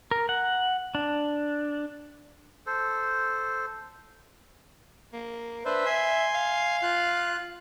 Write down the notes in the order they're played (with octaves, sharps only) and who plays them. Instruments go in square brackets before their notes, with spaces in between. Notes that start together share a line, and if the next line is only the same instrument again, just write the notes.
[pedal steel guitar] A#4
F#5
D4
[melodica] A4 C5
[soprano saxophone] A#3
[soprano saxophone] D4 [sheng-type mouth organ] B4 C5 E5
[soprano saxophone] E5 [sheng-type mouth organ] G#5 C6
[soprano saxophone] F5
[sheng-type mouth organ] F4 F#6